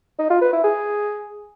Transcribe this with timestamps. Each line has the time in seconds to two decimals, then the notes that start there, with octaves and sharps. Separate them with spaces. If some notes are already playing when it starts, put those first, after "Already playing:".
0.19 D#4
0.30 F4
0.41 B4
0.53 E4
0.64 G#4